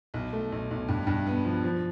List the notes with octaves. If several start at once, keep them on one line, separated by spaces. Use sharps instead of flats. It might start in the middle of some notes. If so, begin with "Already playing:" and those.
B1
A3
B1
B1
G2
G2
B3
F3
F3